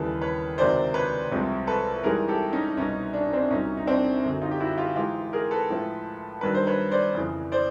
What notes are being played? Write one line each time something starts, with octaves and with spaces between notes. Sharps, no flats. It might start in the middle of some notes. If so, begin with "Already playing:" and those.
Already playing: D#2 C#3 E3 G3 A4 B4
B4 C#5
C#2 C3 D#3 F#3 C5 D5
B4 C#5
C2 C3 F3 G#3
A4 B4
G#2 E3 G3 G#4 A#4
G4 A4
C#4 D#4
C2 B2 F#3 C#4 D#4
D4
D#4
C4 D4
C2 A#2 F#3 C#4 D#4
D#4
C4 D4
F#2 D3 F#3
D#4 F4
G4
E4 F#4
F4 G4
G#2 E3 G#3 F4 G4
G#4 A#4
A4 B4
A2 F3 G#3
G2 D#3 F#3 B4
C5
B4 C#5
C5 D5
F2 C#3 E3
C5 D5